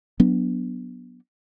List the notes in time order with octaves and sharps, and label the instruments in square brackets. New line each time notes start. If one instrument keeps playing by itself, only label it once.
[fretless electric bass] F#3 B3 D4